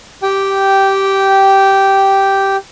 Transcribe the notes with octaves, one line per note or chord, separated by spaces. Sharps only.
G4 G5